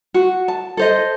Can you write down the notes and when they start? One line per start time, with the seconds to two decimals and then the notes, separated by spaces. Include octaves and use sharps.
0.14 F#4
0.48 A5
0.77 A4 C5 D#5